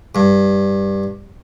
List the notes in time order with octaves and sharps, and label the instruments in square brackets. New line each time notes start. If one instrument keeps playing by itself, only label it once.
[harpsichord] G2